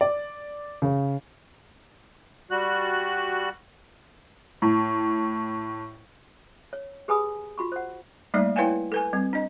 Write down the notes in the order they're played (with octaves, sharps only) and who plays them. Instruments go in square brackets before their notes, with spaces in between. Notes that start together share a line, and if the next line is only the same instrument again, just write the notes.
[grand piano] D5
C#3
[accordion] G3 F#4 F#6
[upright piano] A2
[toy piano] C#5
G4 G#4 B4 G#5 B5 D#6
F4 F#4 B5 C#6
C5 F#5
[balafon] G3 A3 A#3 D#4 D5 E5
E4 B4 C#5 F5 G5 G#5
A4 B4 G#5
G3 C4
D4 D#5